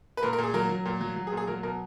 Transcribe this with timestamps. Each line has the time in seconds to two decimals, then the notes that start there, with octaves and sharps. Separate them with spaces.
0.17 B4
0.23 A#2 A#4
0.33 A#4
0.38 A#2
0.43 G#4
0.54 F#3 A#4
0.70 F#3
0.85 A#2
1.01 F#3
1.16 F#3
1.27 G#4
1.32 A#2
1.37 G#4
1.48 F#3 A#4
1.63 B2 A#4